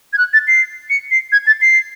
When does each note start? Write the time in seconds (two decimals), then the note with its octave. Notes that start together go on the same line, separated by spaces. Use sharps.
0.13 G#6
0.18 F#6
0.33 A6
0.48 C7
0.90 C#7
1.11 C7
1.32 G#6
1.47 A6
1.61 C7